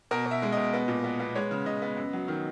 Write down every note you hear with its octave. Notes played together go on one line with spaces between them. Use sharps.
B2 A#4
B2
E5
G#3
B2 D#5
B3
A#2
B3
B3
G#3 C#5
C#3
C#3 D#5
B3
F#2
F#3
D#3